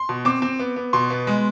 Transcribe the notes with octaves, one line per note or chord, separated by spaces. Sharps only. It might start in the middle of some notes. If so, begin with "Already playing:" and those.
Already playing: C6
B2
C4 D6
C4
B3
B3
B2 C6
B3
G#3